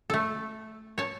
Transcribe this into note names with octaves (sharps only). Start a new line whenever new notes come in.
A3 A4
C#5 A5